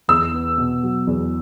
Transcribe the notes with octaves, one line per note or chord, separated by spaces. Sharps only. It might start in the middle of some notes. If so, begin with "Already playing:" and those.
E2 E6
B3
B2
F#3
E2